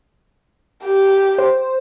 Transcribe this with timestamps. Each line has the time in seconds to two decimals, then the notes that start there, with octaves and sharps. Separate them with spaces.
0.84 G4
1.38 C5